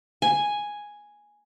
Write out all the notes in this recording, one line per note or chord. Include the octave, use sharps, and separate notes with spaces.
G#5